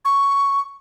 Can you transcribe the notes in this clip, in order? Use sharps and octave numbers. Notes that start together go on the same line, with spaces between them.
C#6